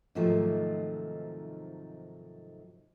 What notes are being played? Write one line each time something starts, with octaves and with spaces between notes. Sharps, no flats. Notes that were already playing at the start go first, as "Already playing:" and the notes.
G#2 C3 D#3 F3 F#3 A3